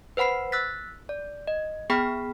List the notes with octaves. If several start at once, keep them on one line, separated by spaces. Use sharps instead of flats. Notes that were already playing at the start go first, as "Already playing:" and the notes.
B4 C5 F#5 B5 C7
E6 F#6 A6 B6
D5
D#5
B3 G#4 G5 B5 F6 B6